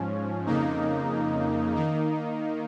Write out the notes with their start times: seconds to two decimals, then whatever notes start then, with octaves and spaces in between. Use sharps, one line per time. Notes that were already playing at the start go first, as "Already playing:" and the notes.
Already playing: G#2 F3 C#4
0.46 F2 C#3 A#3 D#4
1.76 D#3 A#3 D#4